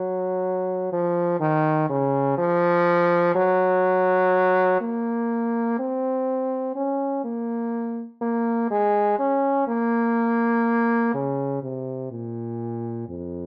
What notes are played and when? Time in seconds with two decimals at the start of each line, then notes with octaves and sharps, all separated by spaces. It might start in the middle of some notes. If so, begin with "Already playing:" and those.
Already playing: F#3
0.92 F3
1.40 D#3
1.90 C#3
2.38 F3
3.35 F#3
4.81 A#3
5.79 C4
6.76 C#4
7.24 A#3
8.22 A#3
8.71 G#3
9.19 C#4
9.67 A#3
11.14 C#3
11.62 C3
12.11 A#2
13.08 F2